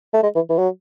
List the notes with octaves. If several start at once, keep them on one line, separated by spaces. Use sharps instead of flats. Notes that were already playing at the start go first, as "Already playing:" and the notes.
A3
G#3
E3
E3
F#3